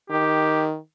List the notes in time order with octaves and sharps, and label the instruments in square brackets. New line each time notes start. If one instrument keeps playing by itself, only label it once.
[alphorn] D#3 [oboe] G4